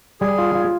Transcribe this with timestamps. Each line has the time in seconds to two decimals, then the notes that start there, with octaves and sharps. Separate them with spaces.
0.21 G3 G#4
0.38 F4
0.55 F4